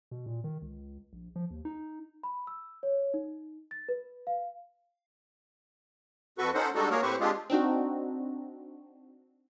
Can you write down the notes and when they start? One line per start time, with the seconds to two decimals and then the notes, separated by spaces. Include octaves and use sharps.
0.11 B2
0.26 A#2
0.44 D#3
0.62 C#2
1.13 A#1
1.36 F3
1.51 D#2
1.65 D#4
2.23 B5
2.47 E6
2.83 C#5
3.14 D#4
3.71 A6
3.89 B4
4.27 F5
6.38 F2 F#4 A4 B4 C#6
6.55 C#4 D#4 A4 C5 F#5
6.75 G3 G#3 D4 D#4 F#4 A4
6.90 A#3 F#4 G#4 A#4 C#5
7.02 A2 C4 G4 B4 C5 C#6
7.20 G#3 C4 D4 F4 G4 G#4
7.50 C4 D4 D#4 F#4